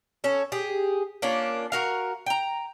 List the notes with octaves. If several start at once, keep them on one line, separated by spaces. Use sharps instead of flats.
C#4 A4
G4 G#4
A#3 C#4 D4 F4
F#4 A#4 F5
G5 A#5